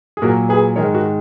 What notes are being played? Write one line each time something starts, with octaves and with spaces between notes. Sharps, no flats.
G#4
A#2 F#3 F#4 A#4
G#4 B4
G#2 D#3 G#3 A#4 C#5
F#4 A#4